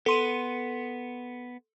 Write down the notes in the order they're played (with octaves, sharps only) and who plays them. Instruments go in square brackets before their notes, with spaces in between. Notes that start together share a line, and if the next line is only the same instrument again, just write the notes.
[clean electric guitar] B3 [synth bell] A4 C6 D#7